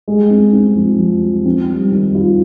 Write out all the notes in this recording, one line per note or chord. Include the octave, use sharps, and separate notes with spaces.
G#3
C4
C4
F3
F3
F3
C4
G3
D#3
F4